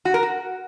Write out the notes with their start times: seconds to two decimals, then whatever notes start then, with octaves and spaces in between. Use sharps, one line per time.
0.05 F#4
0.14 A#4
0.23 F#4